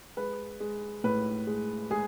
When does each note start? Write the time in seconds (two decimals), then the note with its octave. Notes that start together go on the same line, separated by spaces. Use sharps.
0.17 G#3 B4
0.60 G#3
1.04 A2 B4
1.47 G#3
1.90 G#3 G#4